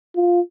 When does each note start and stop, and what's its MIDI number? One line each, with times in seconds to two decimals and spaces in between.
0.16 0.40 65